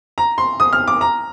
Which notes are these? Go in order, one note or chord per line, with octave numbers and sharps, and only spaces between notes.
A#5
C6
D#6
F6
D6
A#5